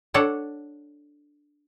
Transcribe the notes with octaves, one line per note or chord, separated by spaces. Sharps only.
D4 A4 C#5 D5 F#5